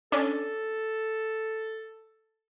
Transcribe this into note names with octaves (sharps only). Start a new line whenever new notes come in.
C#4 D4 A4